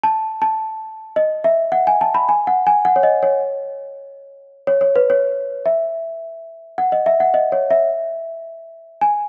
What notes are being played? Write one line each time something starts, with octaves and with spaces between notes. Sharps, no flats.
A5
A5
D#5
E5
F#5
G#5
A5
B5
G#5
F#5
G#5
F#5
C#5
D#5
C#5
C#5
C#5
B4
C#5
E5
F#5
D#5
E5
F#5
D#5
C#5
E5
G#5